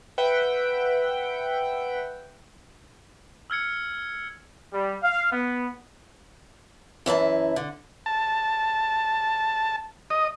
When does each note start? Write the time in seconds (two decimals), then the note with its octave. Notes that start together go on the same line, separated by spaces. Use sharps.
0.18 B4 E5 F#5 G5
3.50 E6 F6 G#6 C#7
4.73 G3
5.02 F5
5.31 B3
7.06 F#2 E3 E4 A5
7.56 D3
8.06 A5
10.10 D#5